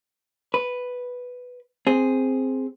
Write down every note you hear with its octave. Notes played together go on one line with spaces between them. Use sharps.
B4
C4 G#4